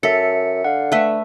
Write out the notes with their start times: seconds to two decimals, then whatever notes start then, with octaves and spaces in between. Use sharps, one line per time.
0.03 F#2 A4 E5 C#7
0.64 D3 F5 F#5
0.92 A3 B4 E5